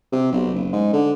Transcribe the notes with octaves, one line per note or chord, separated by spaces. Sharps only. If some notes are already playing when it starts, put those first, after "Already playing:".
C3
B1
F#1
G#2
D3